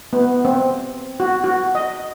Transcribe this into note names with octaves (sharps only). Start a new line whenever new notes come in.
B3
C4
F#4
F#4
D#5